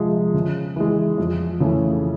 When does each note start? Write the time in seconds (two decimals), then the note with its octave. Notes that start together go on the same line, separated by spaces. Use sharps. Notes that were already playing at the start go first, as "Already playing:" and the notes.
Already playing: C3 F3 G#3
0.34 C#3
0.76 E3 G#3
1.18 F2
1.60 C#3 E3 A3 C#4